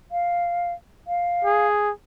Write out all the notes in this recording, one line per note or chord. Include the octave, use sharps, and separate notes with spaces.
F5
F5
G#4